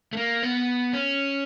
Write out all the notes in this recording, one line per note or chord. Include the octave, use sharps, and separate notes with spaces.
A3
A#3
B3
C#4